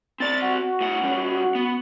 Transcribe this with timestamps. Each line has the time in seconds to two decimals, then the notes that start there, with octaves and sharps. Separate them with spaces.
0.20 C4 D5 A6
0.42 F#4
0.81 A2 F#5
1.03 G3 C#4
1.55 B3